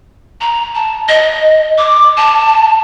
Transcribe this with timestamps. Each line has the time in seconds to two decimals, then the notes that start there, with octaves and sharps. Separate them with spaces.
0.41 A#5
0.75 A5
1.09 D#5
1.78 D6
2.17 A5